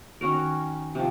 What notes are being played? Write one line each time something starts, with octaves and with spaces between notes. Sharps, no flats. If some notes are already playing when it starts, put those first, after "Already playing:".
D#3 C#4 F#4 A#4
C3 F3